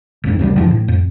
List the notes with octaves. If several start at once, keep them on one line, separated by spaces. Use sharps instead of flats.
G#1 F2 G#2
D2 C3 D#3 G3
F#1 E2 F3
A2
F2